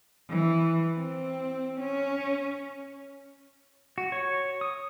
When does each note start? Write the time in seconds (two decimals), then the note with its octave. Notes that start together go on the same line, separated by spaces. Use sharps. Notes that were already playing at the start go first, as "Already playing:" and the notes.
0.30 E3
0.98 C4
1.80 C#4
3.98 F#4
4.12 C#5
4.61 D#6